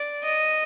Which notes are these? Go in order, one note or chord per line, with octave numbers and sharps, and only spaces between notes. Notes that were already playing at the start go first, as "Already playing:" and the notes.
Already playing: D5
D#5